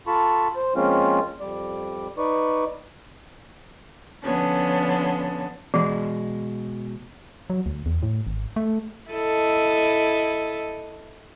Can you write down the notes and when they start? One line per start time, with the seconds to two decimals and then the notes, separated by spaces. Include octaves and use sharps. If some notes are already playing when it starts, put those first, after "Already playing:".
0.07 F4 A4 A5 B5 C#6
0.56 C5
0.75 F3 G#3 A#3 C4 C#4 F4
1.40 F2 G3 D5
2.17 D#4 B4 D5 C#6
4.23 D3 F3 B3 C#4 D4
5.74 B2 E3 G#3
7.50 F#3
7.66 D2
7.86 E2
8.03 A2
8.27 G#1
8.56 A3
9.11 E4 A4 D#5